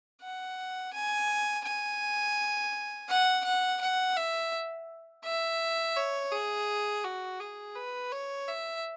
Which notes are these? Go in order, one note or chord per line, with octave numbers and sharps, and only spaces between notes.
F#5
G#5
G#5
F#5
F#5
F#5
E5
E5
C#5
G#4
F#4
G#4
B4
C#5
E5